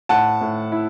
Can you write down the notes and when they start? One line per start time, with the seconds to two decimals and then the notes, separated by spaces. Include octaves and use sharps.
0.09 A2 F#5 A5
0.41 A2
0.72 E4